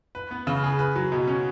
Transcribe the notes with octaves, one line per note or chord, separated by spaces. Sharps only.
B4
B3
C#3
G#4
B4
F#3
B2
C#4